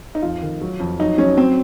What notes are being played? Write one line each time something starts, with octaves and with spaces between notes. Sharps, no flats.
D#4
F2 F4
D#3
F#3
F2
F#3 D#4
F#3 C#4
F#3 C4